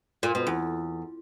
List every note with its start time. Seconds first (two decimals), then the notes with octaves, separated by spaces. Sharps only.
0.23 A#2
0.35 B2
0.47 E2